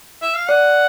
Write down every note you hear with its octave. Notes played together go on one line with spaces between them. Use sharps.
E5
F5
D5 F#5